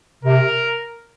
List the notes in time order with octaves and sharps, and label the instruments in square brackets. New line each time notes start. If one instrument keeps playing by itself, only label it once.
[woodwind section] C3 [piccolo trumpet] A#4